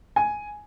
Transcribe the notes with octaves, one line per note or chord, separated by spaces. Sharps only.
G#5